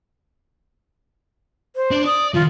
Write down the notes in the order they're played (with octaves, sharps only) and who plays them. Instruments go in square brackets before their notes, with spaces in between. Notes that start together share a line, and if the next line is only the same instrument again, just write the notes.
[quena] C5
[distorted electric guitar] D4 D5
[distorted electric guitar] D5 [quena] D#6
[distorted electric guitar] D#3 F3 [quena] F4